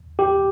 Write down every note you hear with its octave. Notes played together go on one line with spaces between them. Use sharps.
G4